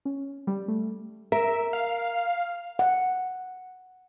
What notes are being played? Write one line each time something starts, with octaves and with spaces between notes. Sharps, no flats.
C#4
G3
A3
A#4 E5
F5
F#5